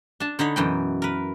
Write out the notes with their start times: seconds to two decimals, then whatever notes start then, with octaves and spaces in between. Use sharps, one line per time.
0.20 D4 A5
0.39 D3 D#4 C#5 B5
0.56 F#2 B2 E3 D#5 G5
1.02 A#4 B4